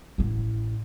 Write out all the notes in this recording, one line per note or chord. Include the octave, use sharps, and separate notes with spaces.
A1 E4